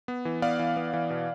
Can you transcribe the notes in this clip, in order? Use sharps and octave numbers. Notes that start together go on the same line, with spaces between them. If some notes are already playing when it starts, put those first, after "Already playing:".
B3
E3
B3 D5 F5
E3
B3
E3
B2